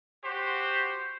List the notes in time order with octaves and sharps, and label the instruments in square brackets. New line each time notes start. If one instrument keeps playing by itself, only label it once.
[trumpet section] F#4 G4 C5